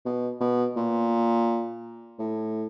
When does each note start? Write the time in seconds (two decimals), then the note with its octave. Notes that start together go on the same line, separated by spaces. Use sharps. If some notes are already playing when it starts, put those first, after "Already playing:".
0.05 B2
0.40 B2
0.77 A#2
2.19 A2